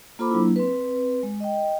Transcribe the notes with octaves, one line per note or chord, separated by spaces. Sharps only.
A#3 F4 A4 C5 B5 D6
F#3 A#3 D4 E4
C4 B4
G#3
D#5 G5